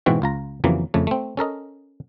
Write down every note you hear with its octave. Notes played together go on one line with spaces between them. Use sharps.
G#2 B2 E3 C4 F#4
C#2 F4 A#5
F2 C#3 E3 F#3 A#3
F2 C#3 A3
A3 C4
C#4 A4 A#4 D#5